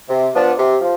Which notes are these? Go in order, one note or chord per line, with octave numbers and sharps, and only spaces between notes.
C3
F3 B3 D4
C3
F3